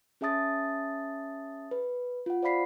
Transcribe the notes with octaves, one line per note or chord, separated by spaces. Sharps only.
C#4 G#4 E5 A5 D#6 A6
B4
F4 F#5
C5 D5 F5 B5 B6 C7